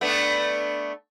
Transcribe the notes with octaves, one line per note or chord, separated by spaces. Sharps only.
A3 B3 D4